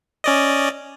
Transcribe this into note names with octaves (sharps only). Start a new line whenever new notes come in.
C#4 D5 D#5